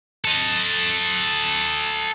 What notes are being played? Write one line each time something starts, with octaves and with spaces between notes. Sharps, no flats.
A4 D#5